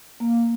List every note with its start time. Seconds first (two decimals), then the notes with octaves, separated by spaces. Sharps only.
0.20 A#3